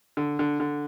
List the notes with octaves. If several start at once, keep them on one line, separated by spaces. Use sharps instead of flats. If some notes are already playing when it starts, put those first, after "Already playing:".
D3
D3
D3